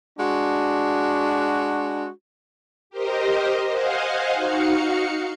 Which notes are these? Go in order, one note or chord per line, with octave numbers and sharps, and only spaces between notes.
G#3 D4 F#4
G4 A#4 C5 D#5
C5 D#5 F5 F#5 G#5
D#4 F#4 F5 C#7